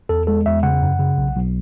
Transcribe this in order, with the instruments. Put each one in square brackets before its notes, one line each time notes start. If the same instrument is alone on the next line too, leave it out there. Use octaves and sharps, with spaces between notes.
[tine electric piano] E2 A4
G#3 A4
E2 E5
C#3 F#5
F#2
C#3
B1
B1